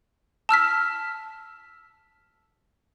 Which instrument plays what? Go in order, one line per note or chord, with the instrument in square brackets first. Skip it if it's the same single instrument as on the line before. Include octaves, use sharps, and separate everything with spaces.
[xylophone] A5 E6 F6 B6